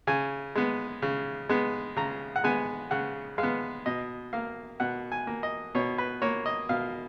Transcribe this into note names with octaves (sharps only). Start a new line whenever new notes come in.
C#3 G#5
G#3 B3
C#3
G#3 B3
C#3 A#5
F#5
G#3 B3 G#5
C#3 F#5
G#3 F5
B3
B2 D#5
A#3 F5
B2 F#5
G#5
A#3
D#5
B2 C#5
B4
A#3 C#5
D#5
B2 F5